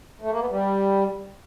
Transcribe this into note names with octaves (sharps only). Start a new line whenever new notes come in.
A3
A#3
B3
G3